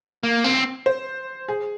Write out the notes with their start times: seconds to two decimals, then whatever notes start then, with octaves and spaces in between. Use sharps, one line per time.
0.23 A#3
0.44 C4
0.86 C5
1.48 G#4